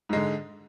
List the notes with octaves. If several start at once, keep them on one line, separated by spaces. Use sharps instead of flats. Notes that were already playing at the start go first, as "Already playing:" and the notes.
G#2 D3 G#3